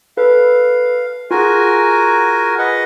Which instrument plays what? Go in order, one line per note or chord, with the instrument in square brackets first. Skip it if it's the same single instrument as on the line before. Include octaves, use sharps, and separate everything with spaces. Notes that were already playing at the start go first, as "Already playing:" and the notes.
[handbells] A4 B4 [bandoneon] F5
[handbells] F4 G#4 [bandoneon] F#4 A#4 G#5
[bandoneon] B4 D#5 F#5